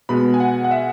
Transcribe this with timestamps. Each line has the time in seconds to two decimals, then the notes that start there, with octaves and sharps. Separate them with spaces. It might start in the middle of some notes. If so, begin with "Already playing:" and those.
0.09 B2 G#3 B3 B5
0.34 G#5
0.40 F#5
0.64 F#5
0.71 E5